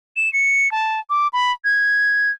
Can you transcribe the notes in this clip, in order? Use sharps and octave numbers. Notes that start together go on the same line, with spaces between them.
E7
C#7
A5
D6
B5
G#6